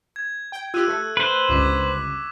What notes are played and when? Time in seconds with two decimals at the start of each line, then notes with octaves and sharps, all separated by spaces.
0.16 G#6
0.52 G5
0.74 F4 G4 E6 F#6 D#7
0.88 A3
1.17 B4 C5
1.49 G1 C#2 C#6 D6 B6